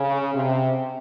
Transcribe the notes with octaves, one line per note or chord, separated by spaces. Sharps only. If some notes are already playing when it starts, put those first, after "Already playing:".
Already playing: C#3
C3